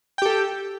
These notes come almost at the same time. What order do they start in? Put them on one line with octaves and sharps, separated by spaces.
G5 G4 A4